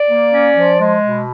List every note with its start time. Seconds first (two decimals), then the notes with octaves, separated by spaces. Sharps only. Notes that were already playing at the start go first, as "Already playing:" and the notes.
Already playing: D5
0.10 A#3
0.33 C#4
0.56 F3
0.79 G#3
1.03 B2